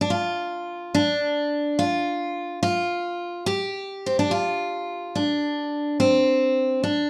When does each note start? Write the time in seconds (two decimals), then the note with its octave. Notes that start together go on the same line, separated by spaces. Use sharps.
0.01 D4
0.10 F4
0.95 D4
1.79 F4
2.63 F4
3.46 G4
4.06 C4
4.19 D4
4.31 F4
5.15 D4
6.00 C4
6.83 D4